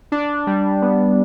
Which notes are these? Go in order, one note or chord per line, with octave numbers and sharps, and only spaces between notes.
D4
G3
B3